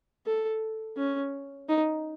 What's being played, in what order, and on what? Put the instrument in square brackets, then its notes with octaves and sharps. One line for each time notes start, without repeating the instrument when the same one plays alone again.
[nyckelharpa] A4
C#4
D#4